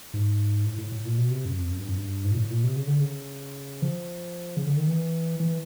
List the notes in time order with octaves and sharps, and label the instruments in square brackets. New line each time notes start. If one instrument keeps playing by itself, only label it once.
[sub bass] G#2
A2
A2
A2
A#2
B2
C3
F#2
F2
F#2
G2
F#2
G2
G#2
A#2
A2
A#2
C3
C#3
D3
C#3
F3
C#3
D3
D#3
E3
E3